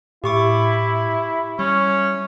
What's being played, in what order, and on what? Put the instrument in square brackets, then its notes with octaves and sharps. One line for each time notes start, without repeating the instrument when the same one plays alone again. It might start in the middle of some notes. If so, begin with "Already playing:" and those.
[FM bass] A2 [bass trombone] E4 [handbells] G4 C#6 D6
[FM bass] G3 [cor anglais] C#4